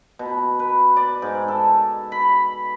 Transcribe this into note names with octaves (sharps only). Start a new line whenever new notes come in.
B2
B4
D5
G#2
A4
B5